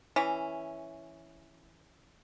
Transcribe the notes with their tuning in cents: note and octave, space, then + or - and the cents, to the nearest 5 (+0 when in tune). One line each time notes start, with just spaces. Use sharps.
E3 +0 C#4 +0